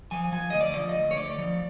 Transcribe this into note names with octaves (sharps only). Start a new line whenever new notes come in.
F3 G#5
F3 G#5
D2 D#5
D5
F3
D#5
D2
C#5
D2 D5
F3